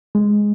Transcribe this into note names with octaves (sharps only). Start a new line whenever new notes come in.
G#3